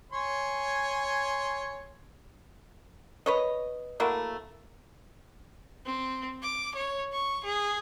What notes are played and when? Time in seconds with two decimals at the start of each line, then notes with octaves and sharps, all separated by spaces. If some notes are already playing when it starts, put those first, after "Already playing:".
0.12 C#5 G#5 C6
3.26 B4 C#5 D#5
4.00 F#3 A3 A#3 E4
5.86 C4
6.43 D6
6.75 C#5
7.13 C#6
7.44 G#4